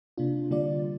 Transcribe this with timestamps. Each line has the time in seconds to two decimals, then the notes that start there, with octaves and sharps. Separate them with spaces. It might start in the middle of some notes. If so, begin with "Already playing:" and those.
0.18 C3 A#3 D4 F4
0.51 D3 G3 A#3 F4 D5